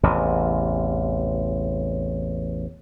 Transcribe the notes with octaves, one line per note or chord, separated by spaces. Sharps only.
A1 E2 C3